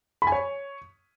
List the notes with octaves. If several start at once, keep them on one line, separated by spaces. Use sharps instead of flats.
B5
G#5
C#5